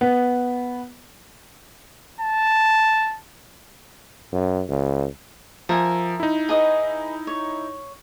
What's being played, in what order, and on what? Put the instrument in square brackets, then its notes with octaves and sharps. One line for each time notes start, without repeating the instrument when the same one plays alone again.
[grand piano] B3
[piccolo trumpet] A5
[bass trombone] F#2
C#2
[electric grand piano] F3 [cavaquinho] A#4 E5 G#5
[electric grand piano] D#4 E4
[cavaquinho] G#4 B4 D#5
C#5